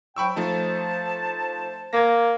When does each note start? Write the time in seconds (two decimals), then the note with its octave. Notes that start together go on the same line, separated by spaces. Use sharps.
0.16 G#2 F#3 G5 B5 C#6 E6
0.36 F3 A3 D#4 C5 A5
1.93 A#3 G#6 A#6